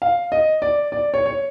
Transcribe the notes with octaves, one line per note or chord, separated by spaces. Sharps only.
F5
D#5
D5
D5
C#5
C#5